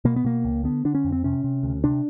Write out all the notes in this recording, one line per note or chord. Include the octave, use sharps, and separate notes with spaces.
B2 A#3
B3
B2 A#3
C#2
D3 B3
D3 D4
C#4
F2
C4
C3 C#4
C3
D2
C3 D4